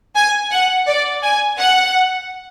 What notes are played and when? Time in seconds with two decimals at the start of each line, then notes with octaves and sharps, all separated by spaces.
0.16 G#5
0.51 F#5
0.87 D5
1.23 G#5
1.58 F#5